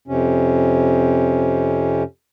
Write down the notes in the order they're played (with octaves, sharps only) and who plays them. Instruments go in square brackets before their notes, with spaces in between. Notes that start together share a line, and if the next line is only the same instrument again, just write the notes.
[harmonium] F2 C3 C#4